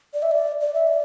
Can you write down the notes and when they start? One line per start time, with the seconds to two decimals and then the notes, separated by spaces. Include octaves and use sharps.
0.14 D5
0.22 E5
0.31 D5
0.61 D5
0.74 E5
0.87 D5